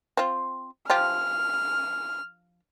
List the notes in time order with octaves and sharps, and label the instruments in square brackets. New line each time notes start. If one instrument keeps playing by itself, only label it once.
[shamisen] C4 F4
[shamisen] F3 F4 G4 [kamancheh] F6